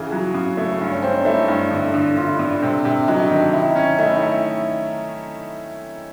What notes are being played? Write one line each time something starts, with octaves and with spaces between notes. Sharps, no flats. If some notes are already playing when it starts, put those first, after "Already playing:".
Already playing: C#3 E3 F#4 G#4
F#3
C#3
A3
G2
C#4
C4 D4
D#4
A3 E4
G2
D3
D3
D3 F4
E4
D3 F4
C3
C3
F#3 D#4
D4
D#3 D#4
E4
C#4
A3 D#4
E4
D#4
E4